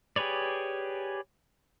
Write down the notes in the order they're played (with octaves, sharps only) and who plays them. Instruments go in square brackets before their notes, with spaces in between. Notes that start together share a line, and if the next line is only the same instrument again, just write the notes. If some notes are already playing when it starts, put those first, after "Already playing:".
[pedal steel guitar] G4 G#4 B4 C#5 D5